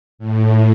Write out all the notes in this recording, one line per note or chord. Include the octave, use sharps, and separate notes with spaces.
A2